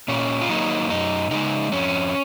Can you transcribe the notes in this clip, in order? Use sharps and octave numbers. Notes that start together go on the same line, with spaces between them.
A#2 C#4
F4
F#3 A#3 D#4
F#2 D#4
C#3 G#3 D#4
F2 C#4